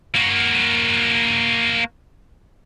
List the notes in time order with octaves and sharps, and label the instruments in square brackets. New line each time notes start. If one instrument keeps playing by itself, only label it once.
[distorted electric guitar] A#3 F#4